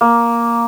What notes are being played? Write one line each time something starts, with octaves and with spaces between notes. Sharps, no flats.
A#3